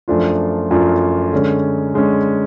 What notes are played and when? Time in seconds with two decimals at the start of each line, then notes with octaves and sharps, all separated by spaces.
0.08 F#2 F3 A3 D4 F4
0.70 F#2 F3 A3 D4 F4
1.32 D3 G#3 C#4
1.94 D3 G#3 C#4